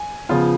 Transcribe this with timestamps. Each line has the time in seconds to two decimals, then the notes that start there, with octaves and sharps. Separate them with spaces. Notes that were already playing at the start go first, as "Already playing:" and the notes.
Already playing: G#5
0.29 C#3 F3 B3 F4